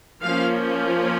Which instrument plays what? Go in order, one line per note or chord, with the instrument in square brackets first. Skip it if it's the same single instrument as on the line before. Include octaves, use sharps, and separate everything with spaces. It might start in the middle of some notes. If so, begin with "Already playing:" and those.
[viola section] F3 A#3 C#4 F5